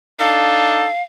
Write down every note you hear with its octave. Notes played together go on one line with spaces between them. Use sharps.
D4 D#4 A4 F5